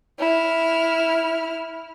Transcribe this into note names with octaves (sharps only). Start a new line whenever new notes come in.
E4 F6